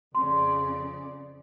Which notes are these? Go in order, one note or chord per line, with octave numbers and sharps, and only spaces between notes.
F2 C#3 D5 C6